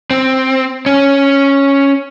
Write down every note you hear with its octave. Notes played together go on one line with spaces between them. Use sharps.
C4
C#4